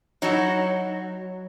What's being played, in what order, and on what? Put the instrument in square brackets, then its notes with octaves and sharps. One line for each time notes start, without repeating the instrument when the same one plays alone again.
[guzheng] F#3 [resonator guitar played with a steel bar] D#4 E4 F#4